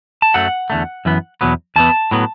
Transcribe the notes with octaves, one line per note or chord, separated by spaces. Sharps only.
A5
F#2 F#3 A3 F#5
E2 D3 A3
F#2 E3 B3
E2 B2 F#3 B3
E2 E3 B3 A5
A2 F#3 B3